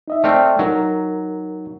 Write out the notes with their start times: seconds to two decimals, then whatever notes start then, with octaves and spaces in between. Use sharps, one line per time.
0.08 D#4 D#5 E5
0.24 A3 C4 D5 F6
0.59 F#3 D#4 A#4